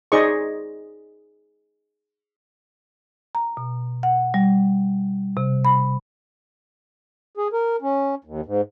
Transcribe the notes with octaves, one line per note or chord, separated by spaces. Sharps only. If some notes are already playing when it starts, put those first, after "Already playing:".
D#4 G#4 C5 D5 D#5 C#6
A#5
B2
F#5
G3
C3
B5
G#4
A#4
C#4
D#2
G#2